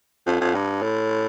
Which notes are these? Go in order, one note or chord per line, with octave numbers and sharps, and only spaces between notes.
F2
F2
G2
A2